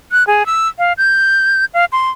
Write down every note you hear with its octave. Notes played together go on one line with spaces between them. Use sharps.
F#6
G#4
E6
F5
G6
F5
C6